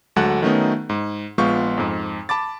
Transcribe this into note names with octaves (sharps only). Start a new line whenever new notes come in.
D2 F#3 G#3 A4 F#5 F#6
D#3 F#3 A3 B3 C#4 D#4
G#2
A#1 G#3 B3 F4 C#6 G6
F2 G#2
A5 B5 D6 A6